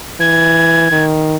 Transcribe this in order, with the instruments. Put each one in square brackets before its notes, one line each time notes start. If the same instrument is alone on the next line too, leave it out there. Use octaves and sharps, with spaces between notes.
[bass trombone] E3 [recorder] G#6
[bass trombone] D#3